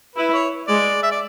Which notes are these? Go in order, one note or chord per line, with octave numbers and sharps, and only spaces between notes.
E4 B4
C#5
G#3 D5
E5
D5